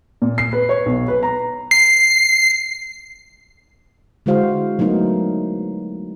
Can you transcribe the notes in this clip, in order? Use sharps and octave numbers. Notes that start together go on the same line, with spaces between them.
A#2
C7
B4
C#5
B1
B4
A#5
C7
D3 G#3 E4 F#4 C5 F5
F#3 A3 B3 D#4 A#4